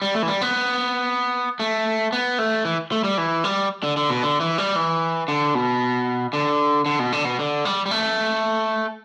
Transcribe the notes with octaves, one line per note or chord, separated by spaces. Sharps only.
G3
A3
E3
G3
B3
A3
B3
A3
E3
A3
G3
E3
G3
D3
D3
B2
D3
E3
G3
E3
D3
B2
D3
D3
B2
D3
B2
D3
G3
G3
A3